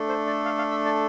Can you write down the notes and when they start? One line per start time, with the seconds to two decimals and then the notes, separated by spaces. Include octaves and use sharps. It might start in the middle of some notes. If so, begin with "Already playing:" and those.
Already playing: A3 D4 A4
0.09 C5
0.27 D5
0.45 F5
0.58 F5
0.71 E5
0.85 D5